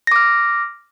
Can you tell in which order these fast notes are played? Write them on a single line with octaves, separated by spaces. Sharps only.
A#6 D6 F6